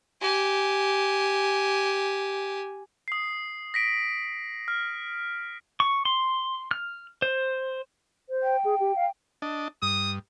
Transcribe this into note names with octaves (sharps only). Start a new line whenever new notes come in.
G4 G#5
D#6 C7
A#6 B6 D7
F6
C#6
C6
F6
C5
C5
G5
G#4
G4
F5
D4 D#5 A5
G2 D#6